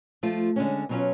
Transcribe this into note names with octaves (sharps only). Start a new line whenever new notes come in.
F3 A3 F4
D3 G#3 C#4
B2 F#3 C#4 F4